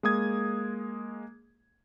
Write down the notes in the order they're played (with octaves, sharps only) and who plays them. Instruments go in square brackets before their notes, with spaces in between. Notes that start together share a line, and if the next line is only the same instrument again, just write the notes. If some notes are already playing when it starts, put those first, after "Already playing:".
[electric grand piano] G#3 A#3 D#6 G#6